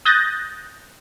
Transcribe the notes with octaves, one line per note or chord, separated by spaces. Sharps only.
D#6 F#6 G6 A6 A#6